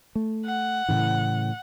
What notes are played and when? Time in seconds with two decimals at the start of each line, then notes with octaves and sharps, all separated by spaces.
0.15 A3
0.46 F#5
0.89 A2 C#3 E3